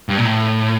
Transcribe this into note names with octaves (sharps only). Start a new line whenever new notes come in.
G2
A#2
A2